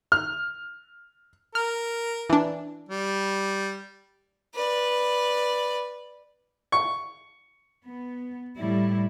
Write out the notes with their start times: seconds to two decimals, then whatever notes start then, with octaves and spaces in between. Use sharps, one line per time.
0.12 F6
1.55 A#4 F6
2.30 E3 D4
2.89 G3
4.55 B4 D5
6.72 C#6
7.85 B3
8.57 A2 G3 E4